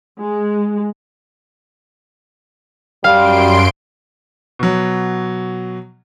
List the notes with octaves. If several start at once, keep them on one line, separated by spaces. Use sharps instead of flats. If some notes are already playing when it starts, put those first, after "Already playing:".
G#3
F#2 G3 F5 C6 D7
B2 F#3